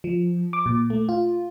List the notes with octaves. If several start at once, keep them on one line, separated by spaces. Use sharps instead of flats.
F3
D6
A#2
A3
F4